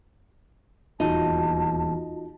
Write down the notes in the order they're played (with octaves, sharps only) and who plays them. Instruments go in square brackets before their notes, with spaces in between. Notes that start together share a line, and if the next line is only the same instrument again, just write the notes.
[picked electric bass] D#1 E2 [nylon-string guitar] D#4 [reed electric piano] F4 F#4 [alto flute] A5